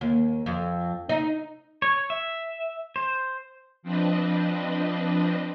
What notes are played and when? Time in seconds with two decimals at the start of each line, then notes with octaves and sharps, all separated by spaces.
0.01 D#2
0.46 F2
1.09 D#4
1.82 C#5
2.10 E5
2.96 C5
3.83 F3 C4 D4 B4 D#5